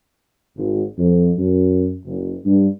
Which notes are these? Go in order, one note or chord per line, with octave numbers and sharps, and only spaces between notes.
G#1
F2
F#2
F#1
G2